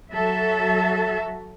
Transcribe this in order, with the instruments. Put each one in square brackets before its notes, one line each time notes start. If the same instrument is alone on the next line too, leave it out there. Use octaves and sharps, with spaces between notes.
[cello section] F#3 F#4 A4 E5